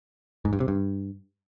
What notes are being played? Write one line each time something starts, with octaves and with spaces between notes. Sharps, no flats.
G#2
G2
C3
G2